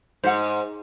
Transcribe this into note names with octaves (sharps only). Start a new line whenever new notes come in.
G#2 C5 F#5